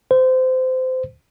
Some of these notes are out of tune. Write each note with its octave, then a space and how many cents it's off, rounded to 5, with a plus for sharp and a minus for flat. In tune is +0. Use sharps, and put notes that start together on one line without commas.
C5 -25